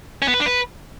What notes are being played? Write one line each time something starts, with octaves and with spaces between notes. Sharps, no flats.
C#4
B3
B4
D4
B4